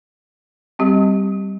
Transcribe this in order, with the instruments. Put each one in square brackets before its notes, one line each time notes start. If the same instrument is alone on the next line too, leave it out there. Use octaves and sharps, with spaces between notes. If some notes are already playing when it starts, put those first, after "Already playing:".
[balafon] G3 C4 G4